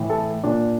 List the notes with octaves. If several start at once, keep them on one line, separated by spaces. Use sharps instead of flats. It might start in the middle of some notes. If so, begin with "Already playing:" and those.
Already playing: A2 E3
A4
A#2 D4